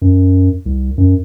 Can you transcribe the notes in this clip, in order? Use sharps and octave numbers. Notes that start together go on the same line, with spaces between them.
F#2
C2
F#2